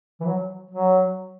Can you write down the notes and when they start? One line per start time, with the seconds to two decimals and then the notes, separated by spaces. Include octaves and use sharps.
0.20 E3
0.26 F#3
0.71 F#3